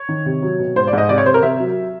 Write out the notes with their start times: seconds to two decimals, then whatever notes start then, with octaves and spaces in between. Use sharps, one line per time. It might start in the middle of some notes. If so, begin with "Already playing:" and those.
Already playing: C#5
0.09 D#3
0.26 C3
0.43 F#3
0.59 B2
0.76 G#2 C5
0.87 D5
0.93 G#2 D#5
1.09 C3 D5
1.18 C#5
1.26 C3 C5
1.34 A#4
1.42 C3 E5
1.60 F#3